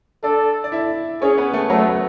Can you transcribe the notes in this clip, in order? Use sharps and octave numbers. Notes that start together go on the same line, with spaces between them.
D4 A4 D5
D5
E4 E5
C#4 G#4 C#5
B3 B4
A3 A4
F#3 A3 F#4